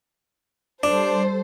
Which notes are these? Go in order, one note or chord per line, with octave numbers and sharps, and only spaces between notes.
G3 D4 A4 C5